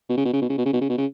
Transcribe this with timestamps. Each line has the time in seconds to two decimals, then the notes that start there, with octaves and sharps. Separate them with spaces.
0.09 B2
0.17 C#3
0.25 B2
0.34 C#3
0.42 B2
0.49 C#3
0.58 B2
0.66 C#3
0.73 B2
0.81 C#3
0.89 B2
0.98 C#3